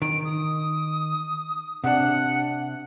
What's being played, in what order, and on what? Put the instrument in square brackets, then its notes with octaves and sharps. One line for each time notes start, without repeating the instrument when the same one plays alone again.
[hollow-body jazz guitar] D#3 [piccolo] D7
[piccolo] D#6
[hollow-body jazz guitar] C3 D4 [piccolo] F#5